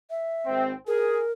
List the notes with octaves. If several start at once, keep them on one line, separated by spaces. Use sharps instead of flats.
E5
G#1 C4
G#4 A#4